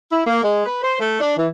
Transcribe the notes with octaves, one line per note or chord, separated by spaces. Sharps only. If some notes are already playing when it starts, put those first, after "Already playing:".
E4
A#3
G#3
B4
C5
A3
D4
E3